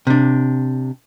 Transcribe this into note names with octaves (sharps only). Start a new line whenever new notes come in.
C3 D4